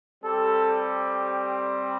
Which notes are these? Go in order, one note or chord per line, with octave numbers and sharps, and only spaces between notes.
G3 C4 G4 A4